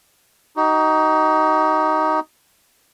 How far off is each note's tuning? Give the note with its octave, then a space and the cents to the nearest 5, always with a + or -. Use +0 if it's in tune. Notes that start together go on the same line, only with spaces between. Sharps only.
D#4 +5 F#4 +45